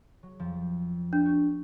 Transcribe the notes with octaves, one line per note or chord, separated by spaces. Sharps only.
F#3
F2 F3
D4
B3 F#4